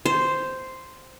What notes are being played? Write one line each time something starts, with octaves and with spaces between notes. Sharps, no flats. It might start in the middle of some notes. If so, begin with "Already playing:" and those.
C5